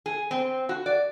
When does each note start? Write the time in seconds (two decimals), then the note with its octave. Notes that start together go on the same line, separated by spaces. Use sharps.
0.06 G#4
0.31 C4
0.69 F#4
0.86 D5